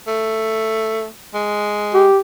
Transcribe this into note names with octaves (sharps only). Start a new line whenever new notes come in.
A3
G#3
G4